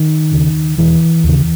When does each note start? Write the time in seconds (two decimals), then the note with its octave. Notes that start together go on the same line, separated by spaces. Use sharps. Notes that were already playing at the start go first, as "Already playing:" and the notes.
Already playing: D#3
0.32 D#2 C#3
0.78 E1 E3
1.24 D#2 C#3